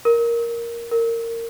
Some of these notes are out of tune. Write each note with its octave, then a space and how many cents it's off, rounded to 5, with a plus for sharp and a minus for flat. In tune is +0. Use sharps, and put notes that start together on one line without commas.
A#4 +5
A#4 -20